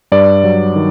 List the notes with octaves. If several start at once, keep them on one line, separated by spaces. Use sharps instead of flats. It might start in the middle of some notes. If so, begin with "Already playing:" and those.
G2 D5
F#3
D#3